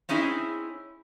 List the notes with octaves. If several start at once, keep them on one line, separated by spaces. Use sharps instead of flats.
C4 C#4 D#4 E4 G#4